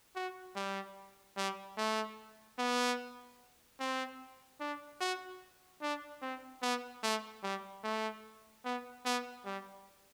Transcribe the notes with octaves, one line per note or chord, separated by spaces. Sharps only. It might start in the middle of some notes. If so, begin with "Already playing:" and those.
F#4
G3
G3
A3
B3
C4
D4
F#4
D4
C4
B3
A3
G3
A3
B3
B3
G3